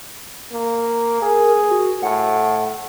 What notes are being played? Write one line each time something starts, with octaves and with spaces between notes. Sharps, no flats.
A#3
G#4 A#4
F#4
A2 F#5